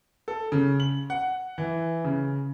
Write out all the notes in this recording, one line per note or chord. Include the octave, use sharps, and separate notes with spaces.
A4
C#3
F#7
F#5
E3
C#3